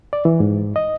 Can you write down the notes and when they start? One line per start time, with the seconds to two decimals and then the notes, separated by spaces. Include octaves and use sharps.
0.13 D5
0.25 E3
0.40 G#2
0.76 D#5